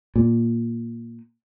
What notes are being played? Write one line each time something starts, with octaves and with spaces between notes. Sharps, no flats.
A#2